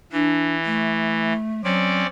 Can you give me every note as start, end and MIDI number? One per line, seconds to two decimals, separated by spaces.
0.12 1.33 52
0.12 0.55 62
0.65 1.64 57
1.64 2.03 54
1.64 2.07 60
1.64 2.07 61
1.64 2.07 74